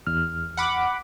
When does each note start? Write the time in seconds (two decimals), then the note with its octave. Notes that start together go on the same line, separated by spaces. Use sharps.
0.07 E2 F6
0.57 F#5 B5 D6